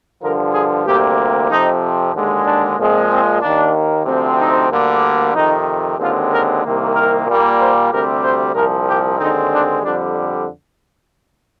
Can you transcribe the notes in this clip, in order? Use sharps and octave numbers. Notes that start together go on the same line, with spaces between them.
G2 D3 F3 A#4
G#4
D2 C3 G3 A#3 G4
F2 C3 F3 D#4
D#2 D3 G#3
D4
A#2 F3 G#3 C4
C4
D#2 D#3 A#3 D4
D2 C3 F3 C4
D#4
D2 D3 G3 A#3
F2 C3 D#3 D#4
D#2 D3 G#3 C4 F4
A#4
C2 C3 D#3 A#3
A#4
A#2 G3 A#3
C5
D2 C3 G3 C4 A#4
C5
C2 A#2 F3 A#4
G4
D#2 D3 G#3 C4 D#4
D4
F2 D3 G3 D4